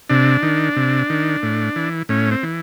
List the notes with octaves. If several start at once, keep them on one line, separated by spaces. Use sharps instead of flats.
C3 D4
D#3
C3
D#3
A2
E3
A2 C#4
C4
E3